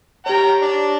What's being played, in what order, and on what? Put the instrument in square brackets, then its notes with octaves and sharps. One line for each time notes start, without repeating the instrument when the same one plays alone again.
[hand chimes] G4 C#5 [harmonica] G5 A#5
[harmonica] D4